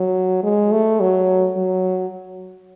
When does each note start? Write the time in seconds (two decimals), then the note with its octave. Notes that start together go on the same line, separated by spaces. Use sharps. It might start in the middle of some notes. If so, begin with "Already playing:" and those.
Already playing: F#3
0.43 G#3
0.72 A3
1.00 F#3
1.56 F#3